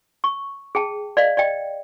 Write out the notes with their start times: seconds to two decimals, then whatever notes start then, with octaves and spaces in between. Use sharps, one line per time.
0.24 C#6
0.75 G#4 G5 A5
1.17 D5 D#5 F5
1.37 D5 D#5 G5